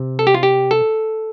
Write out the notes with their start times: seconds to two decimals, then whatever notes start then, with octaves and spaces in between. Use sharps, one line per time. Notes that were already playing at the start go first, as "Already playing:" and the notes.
Already playing: C3
0.19 A4
0.27 G4
0.34 F4
0.43 G4
0.71 A4